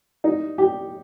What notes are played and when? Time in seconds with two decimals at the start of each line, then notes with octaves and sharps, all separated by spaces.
0.24 D#4
0.58 G4